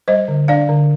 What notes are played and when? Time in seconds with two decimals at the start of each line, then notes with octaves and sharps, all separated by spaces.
0.08 G3 C5 D#5
0.28 D3
0.48 D4 D5 F5
0.69 D3